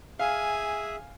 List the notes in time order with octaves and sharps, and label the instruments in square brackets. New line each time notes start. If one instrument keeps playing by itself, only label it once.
[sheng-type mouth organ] G#4 E5 [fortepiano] F5 [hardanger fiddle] G#5